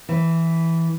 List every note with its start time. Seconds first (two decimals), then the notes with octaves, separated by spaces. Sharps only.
0.09 E3